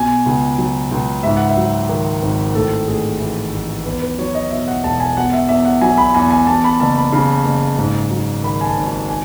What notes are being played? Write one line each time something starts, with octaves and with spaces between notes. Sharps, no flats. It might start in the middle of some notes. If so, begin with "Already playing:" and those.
Already playing: B2 G#5
C#2
F#3
C#2
G#2 E5
F#5
E5
F#3
D#3
G#1
A2 A4
A1 G#4
E3
A1
E2 B4
B4
F#3 C#5
D#5
B2 E5
F#5
E1 A5
G#5
B2 F#5
E5
E2 E5
F#5
F#3 G#5
B5
E2 G#5
G#5
E2 A5
B5
F#1 A5
B5
C#3
F#1
G#2
F#3
D#3 B5
G#5
A5
G#1
G#5
G#5